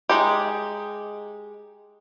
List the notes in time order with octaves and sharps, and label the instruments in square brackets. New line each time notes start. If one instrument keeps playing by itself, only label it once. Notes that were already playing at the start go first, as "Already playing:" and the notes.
[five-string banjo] G#3 D#4 G4